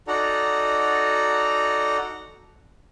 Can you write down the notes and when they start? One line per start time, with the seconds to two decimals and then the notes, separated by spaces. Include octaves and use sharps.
0.08 D#4 F#4 A4 D5 F#5 A#5